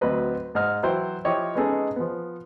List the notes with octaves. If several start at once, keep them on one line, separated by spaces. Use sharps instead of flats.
D2 F#3 C4 B4 D#5
G#2 D#5 F6
E3 F#3 E4 C5 G5
F3 E4 G4 C#5 D#5
G#3 B3 C#4 D#4 G#4 A4
F3 B3